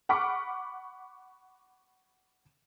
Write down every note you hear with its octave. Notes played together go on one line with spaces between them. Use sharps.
F#5 B5 C#6 D6 F6 B6